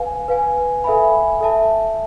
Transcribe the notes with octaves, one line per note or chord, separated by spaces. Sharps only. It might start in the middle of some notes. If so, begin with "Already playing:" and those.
Already playing: B4 F5 G#5
B4 F5 G#5
A4 E5 G#5 B5
A4 E5 A5